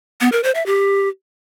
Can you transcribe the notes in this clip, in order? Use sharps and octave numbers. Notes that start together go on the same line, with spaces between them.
B3
A#4
C5
E5
G4